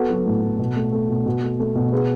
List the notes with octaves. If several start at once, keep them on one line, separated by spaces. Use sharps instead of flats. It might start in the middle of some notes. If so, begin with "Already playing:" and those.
Already playing: B3 F#4 A4
F#3
A2
A2
B2
A3
A3
B2
B2 F#4
A3
A3
B2
B3 G#4